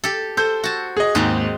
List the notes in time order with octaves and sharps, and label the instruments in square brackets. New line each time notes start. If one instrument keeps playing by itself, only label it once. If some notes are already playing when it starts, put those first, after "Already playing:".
[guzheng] G4 A4
[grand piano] A4 G6 [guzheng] C5
[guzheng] F#4 A5
[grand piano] G#4 D#5
[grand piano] D#2 G#2 [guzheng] G#3 C4